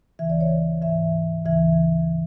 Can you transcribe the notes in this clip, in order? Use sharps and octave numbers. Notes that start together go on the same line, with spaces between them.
D2 C#3 E3 E5
D5
C#5
G#2 E3 E5
D2 C#3 E3 E5